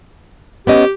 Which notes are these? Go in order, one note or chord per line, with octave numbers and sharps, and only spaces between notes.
B3 C#4 G4 D#5